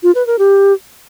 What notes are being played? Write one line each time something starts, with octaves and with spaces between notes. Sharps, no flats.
F4
B4
A#4
G4